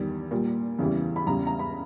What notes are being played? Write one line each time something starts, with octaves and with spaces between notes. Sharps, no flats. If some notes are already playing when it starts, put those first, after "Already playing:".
Already playing: E2 D#3 G3
A#2 G3
E2 C#3 E3 G3
B5
E2 C#3 G3 A#5
A#5
B5